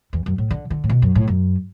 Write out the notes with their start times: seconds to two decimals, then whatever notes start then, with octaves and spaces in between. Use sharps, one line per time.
0.13 E2
0.26 F#2
0.38 A2
0.51 D3
0.70 D3
0.84 A2
0.89 B2
1.02 F#2
1.15 A2
1.28 F#2